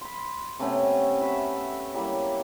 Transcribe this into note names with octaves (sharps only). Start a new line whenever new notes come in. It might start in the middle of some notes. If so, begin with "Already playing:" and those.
B5 C6
C3 A3 B3 C#4
B4 C#5 E5 F#5
F#3 G3 A#3 E4